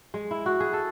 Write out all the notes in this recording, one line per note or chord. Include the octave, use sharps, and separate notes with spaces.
G#3
E4
F#4
G#4
A4